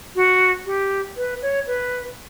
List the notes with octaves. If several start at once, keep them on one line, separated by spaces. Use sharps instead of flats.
F#4
G4
B4
C#5
B4